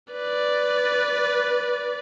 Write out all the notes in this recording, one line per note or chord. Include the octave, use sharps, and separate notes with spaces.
B4 D5